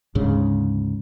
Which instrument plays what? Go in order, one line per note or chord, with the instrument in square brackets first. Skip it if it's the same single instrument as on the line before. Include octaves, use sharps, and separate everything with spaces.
[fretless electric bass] D2 G#2 C#3